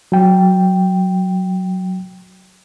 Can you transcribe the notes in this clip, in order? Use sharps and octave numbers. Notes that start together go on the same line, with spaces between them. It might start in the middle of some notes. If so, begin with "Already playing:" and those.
F#3 G5